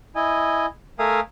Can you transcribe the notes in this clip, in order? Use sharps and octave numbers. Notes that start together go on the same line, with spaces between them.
E4 D#5 G#5
A3 A#4 E5 F5 G#5 D#6